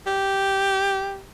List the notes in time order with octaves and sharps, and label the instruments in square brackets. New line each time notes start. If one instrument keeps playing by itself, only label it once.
[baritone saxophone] G4